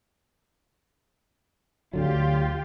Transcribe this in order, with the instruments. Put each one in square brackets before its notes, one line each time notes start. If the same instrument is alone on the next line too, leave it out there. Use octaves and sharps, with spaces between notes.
[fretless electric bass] D2 D3 F#3 [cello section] F4 G4